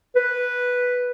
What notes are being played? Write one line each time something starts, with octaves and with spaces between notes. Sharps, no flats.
B4